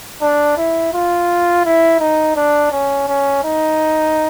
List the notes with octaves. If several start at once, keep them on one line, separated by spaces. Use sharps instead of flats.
D4
E4
F4
E4
D#4
D4
C#4
C#4
D#4